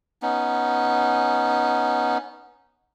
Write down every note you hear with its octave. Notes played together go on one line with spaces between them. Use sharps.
B3 C#4 D#4